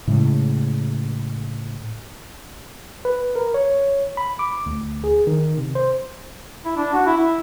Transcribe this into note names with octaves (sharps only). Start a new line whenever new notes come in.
A2 C#3 G#3
B4
A#4
C#5
B5
D6
D2
G#4
D#3
C3
C5
E4
D4
F#4
E4
E4